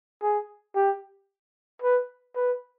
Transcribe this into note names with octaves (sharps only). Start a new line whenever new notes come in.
G#4
G4
B4
B4